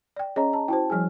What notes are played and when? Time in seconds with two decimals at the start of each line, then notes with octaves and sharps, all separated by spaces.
0.16 D5 G5
0.36 C#4 G#4 C#5 D#5 A#5
0.53 A5
0.68 E4 F#4 C5 G5 A5
0.90 F3 G3 G#4 G#5 F6